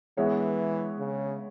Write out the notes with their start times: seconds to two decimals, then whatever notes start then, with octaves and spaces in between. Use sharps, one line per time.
0.17 E3 G#3 B3 G#4 C#5 E5
0.99 C#3